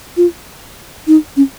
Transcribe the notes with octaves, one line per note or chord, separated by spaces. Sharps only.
F4
D#4
C#4